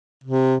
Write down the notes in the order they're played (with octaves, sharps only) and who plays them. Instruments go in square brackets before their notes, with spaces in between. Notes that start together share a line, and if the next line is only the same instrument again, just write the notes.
[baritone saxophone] C3